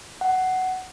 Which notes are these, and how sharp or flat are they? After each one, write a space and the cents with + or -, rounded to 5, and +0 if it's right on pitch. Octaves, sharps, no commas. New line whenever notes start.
F#5 +10